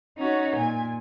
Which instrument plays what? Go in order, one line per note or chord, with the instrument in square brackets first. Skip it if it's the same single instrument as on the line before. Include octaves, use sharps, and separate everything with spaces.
[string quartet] C#4 D#4 F#4
A#2 G#5